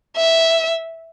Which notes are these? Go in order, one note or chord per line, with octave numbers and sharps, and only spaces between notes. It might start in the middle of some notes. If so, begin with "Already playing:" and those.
E5